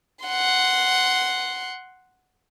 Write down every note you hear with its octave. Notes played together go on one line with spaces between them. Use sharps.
F#5 C6